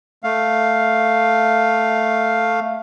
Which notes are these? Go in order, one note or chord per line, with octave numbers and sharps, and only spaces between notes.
A3 F5